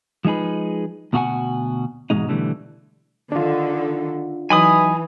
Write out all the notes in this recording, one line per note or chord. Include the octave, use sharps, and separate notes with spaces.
F3 G#3 D#4 G#4 B4
D2 B2 F#4 G#4 F#5 G#5
E2 G#2 B2 G#3 D#4
B2 D3 E3 G3 A3
D3 D#3 D4 F4
E3 F#3 D#4 G#5 B5 D#6